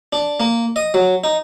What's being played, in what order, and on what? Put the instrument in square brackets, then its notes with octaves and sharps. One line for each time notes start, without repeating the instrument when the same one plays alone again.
[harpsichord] D4
A#3
D#5
F#3
D#4